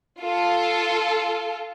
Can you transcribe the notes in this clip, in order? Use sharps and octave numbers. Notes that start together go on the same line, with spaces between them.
F4 A4